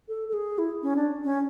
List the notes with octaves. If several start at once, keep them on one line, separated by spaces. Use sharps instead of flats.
A4
A4
G#4
E4
C#4
D4
C#4